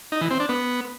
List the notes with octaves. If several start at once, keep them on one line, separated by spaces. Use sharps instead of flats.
D#4
E3
C4
D4
B3